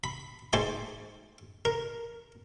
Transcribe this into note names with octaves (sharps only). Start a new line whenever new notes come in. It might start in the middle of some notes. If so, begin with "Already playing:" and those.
B5
G#2 C5 G#5 D6
A#4